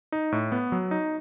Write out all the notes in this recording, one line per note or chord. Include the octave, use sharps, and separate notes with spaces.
D#4
A2
B3
F#3
D#4